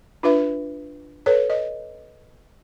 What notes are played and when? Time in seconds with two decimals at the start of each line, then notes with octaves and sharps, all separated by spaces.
0.23 D4 F4 B4 E5
1.26 A4 B4 C#5
1.50 D#5